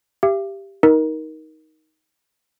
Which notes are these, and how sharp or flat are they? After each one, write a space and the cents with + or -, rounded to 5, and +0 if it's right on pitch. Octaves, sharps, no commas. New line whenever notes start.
G4 +0 E5 +45
D#4 +15 A#4 +15